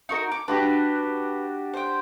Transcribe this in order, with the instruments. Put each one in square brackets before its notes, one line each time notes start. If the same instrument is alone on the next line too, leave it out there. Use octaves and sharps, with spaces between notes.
[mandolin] D#4 F#4 A#4
D6
[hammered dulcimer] D4 F#4 G4 [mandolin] B4
[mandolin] C5 G5